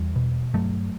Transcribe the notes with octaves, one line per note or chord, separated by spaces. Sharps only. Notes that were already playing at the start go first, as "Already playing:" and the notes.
Already playing: E2 E3 G3
B2
G2 F#3 A3